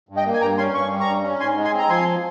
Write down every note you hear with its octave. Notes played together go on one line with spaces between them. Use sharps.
G2
D#5 G5
A#3
G#5
G2 G5 A#5
C#4 G#5 C6
G2 C#6
G3
A#5 C#6
G2
C#4
G#2 G#5 C6
G#3
G#5 C6
C4
A#5
F3 G#5 C6